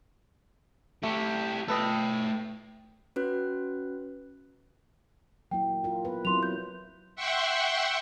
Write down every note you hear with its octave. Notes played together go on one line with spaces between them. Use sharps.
A3 E4 G4
A3 A4 B4 D#5 G5
C#4 F#4 B4 F#6
F#3 A#3 E4 G5
F4 A#4
B3 B4
F#3 C4 E4 C6 F7
G6
E5 F#5 G5 C6 C#6